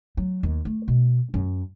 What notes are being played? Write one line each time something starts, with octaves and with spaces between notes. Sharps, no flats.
F#3
D#2
A3
B2
F#2